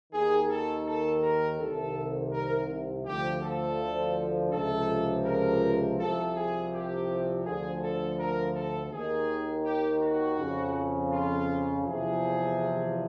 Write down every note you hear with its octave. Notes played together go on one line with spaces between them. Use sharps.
D#2 D#3 G#4
A4
A4
A#4
C2 C3 D#3 A4
A#4
D2 D3 F3 G4
A4
C#2 C3 F3 A4
A#4
C2 C3 F3 A4
G#4
G4
D2 D3 F3 G#4
A4
A#4
A4
D#2 D#3 G#4
G4
F#4
F2 C#3 F3
F4
E2 C3 F3 G#4